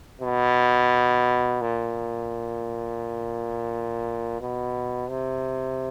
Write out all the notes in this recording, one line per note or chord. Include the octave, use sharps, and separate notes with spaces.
B2
A#2
B2
C3